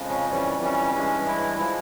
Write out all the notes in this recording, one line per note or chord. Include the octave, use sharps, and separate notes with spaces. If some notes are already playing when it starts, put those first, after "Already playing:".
Already playing: F2 C#3 F3 G#3
C#4
F2 E3 G3 C#4
C#4
G2 E3 G#3 C#4
E4
F3 G#3 E4